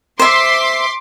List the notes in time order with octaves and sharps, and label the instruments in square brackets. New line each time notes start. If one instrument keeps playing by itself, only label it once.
[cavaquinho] C5 E5 [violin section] C6 D6 B6